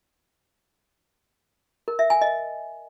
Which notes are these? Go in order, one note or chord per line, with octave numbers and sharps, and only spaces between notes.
A#4
E5
G#5
D#5